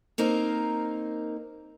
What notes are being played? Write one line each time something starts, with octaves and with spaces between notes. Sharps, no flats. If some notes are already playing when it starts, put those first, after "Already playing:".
A#3 C4 D#4 A#4